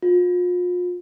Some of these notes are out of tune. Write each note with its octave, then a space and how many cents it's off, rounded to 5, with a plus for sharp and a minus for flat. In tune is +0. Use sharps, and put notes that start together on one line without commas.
F4 +40